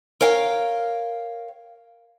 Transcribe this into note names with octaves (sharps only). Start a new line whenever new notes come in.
A#4 C#5 F5 G5